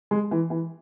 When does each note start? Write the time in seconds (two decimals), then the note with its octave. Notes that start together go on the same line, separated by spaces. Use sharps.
0.11 G#3
0.31 E3
0.50 E3